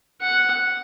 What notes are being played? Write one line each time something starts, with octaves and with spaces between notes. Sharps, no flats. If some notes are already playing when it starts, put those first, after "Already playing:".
F#5